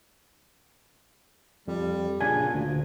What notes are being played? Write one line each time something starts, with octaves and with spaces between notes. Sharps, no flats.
F2 G3
A#2 C#3 D4 G#5
D2